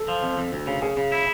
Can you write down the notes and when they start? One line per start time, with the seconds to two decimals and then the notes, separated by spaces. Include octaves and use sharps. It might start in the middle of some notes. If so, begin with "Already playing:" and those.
Already playing: A4
0.08 F3
0.23 F2
0.38 F2
0.53 D2
0.67 C#3
0.82 C#3 G#4
0.97 C#3
1.12 E4